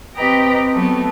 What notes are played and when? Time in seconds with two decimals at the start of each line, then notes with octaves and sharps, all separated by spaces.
0.15 C4 G4 B4 D#5 G5 A#5
0.72 F#3 A3 B3